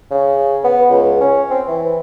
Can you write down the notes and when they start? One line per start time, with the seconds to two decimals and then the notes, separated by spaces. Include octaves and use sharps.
0.11 C#3
0.64 B3
0.90 C#2
1.21 C#4
1.50 C4
1.68 E3